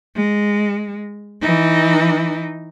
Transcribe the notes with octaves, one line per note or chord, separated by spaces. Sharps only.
G#3
E3 D#4